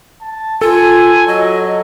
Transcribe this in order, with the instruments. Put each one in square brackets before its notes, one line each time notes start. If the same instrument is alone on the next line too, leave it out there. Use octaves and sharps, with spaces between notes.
[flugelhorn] A5
[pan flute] F4 [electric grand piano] A4 [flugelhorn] G#5
[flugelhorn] F#3 [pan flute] D#5